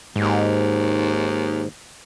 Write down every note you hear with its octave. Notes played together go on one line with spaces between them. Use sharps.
D#2 G#2